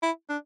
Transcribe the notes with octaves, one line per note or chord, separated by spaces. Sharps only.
E4
D4